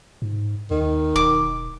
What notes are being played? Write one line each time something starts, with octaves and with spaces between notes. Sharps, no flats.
G#2
D#2 D#3
E1 D6